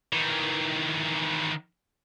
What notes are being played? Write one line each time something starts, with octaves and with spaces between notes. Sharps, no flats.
D#3 E3